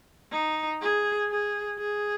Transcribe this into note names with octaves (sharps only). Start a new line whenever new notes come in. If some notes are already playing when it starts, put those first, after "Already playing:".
D#4
G#4
G#4
G#4